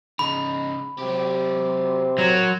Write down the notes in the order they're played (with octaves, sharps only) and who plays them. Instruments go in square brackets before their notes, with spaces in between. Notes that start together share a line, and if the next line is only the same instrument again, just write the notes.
[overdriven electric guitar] C#3 D#4 [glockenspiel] B5
[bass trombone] C3 [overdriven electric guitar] F#3 G4
[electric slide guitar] F#3 [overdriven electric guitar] A#4 C6